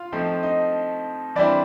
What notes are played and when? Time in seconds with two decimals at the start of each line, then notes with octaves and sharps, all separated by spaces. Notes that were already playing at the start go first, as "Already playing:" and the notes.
Already playing: F4 F5
0.12 F3 A3 C4 D#4
0.43 D#4 D#5
1.36 E3 G3 C4 D4 E4 D5